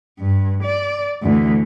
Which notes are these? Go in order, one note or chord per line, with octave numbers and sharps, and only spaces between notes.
G2
D5
D2 E3